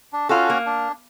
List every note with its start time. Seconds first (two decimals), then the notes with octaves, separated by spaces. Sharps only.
0.13 D4
0.29 C#4 F4 F#4 A4
0.50 A#3
0.66 D4